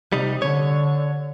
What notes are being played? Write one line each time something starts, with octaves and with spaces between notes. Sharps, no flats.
C3 G3 D#4
D3 C#5